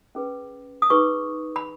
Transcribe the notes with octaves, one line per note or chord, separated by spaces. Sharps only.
C#4 G#4 B4
D#6
D#4 G#4 B4 C#6
B5